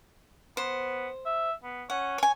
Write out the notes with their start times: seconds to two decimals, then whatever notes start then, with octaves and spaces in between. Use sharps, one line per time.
0.57 B3 C5
1.26 E5
1.64 B3
1.90 C#4 F#5
2.18 C#5 G#5